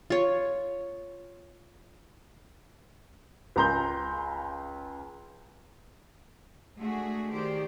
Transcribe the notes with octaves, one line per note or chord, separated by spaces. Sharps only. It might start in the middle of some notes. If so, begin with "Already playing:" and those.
F4 C#5
C#2 C#3 A#5 C6 G6
G#3 A3 D4 F#4 G#4
D#3 G4 C5 D5